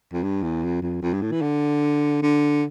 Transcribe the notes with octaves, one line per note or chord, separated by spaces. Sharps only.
F2
G2
E2
F2
F2
F2
G2
A2
E3
D3
D3